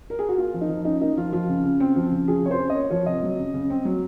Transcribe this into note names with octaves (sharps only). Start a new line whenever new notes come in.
A#4
G#4
F#4
A#3 F4
F3
D#4
F3
C#4 D#4
A#3 D#4
F3 F4
F3 F4
C#3
C#3
C4
F3
C#3
F3 G#4
C3 C#5
C5
C#4
D#5
A#3 C#5
F3 C#5
C3 D#5
F#3
C#3
C#3
C4
F#3